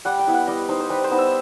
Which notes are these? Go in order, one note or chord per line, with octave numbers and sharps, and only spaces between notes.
G3 F#5
G5
B3 E4
F#5
G3 D#5
D#4 C5
C5
G3 B4
C5
B3 D#4
E5